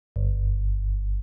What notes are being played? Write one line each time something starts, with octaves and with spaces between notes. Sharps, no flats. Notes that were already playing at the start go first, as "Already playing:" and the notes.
G1